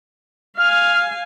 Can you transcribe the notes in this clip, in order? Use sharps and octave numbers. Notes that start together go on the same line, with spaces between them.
F5 G#5 F6